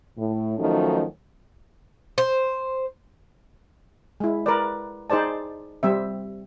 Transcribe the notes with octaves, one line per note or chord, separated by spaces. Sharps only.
A2
D#3 F3 F#3 A3 C#4 D#4
C5
G#3 E4
A#4 B4 D5
D#4 G#4 C5 D5 A5
G3 C4 E5